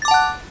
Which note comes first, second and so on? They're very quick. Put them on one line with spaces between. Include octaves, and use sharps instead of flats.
A6 D6 A5 F#5 F#6